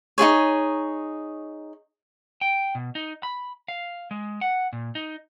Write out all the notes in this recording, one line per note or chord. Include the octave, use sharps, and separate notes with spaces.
D#4 F4 G#4 C#5
G5
B2
D#4
B5
F5
G#3
F#5
A#2
D#4